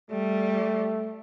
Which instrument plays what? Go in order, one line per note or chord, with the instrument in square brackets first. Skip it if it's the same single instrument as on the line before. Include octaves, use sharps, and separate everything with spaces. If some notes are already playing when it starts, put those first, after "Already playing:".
[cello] G3 [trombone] A3